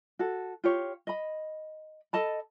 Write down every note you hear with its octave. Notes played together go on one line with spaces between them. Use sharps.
F#4 A4
F4 G4 C#5
D#5 B5
A4 D#5 A5 B5